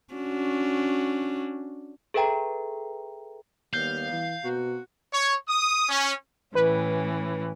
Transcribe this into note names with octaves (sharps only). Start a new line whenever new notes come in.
C#4 D4 F#4
G#4 A4 B4 E5 G5 A#5
D#2 G3 B3 F5 G6
E3
B2 A#3 C4 F#4
C#5
D#6
C#4
A2 E3 C#4 B4